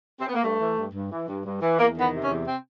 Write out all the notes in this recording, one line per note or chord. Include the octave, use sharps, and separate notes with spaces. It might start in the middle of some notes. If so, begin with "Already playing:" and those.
C4
B3
A#3
G2 A3
E3
G2
G2
E3
G2
G2
E3
E2 A#3
D#3
B3
C3
C#4
E2
C4